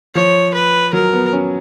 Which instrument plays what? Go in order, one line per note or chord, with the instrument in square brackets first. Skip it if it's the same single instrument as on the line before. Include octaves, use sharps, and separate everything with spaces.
[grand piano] F3 [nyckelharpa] C#5
[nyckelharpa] B4
[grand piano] F#3 [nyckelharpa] A#4
[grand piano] B3
C#4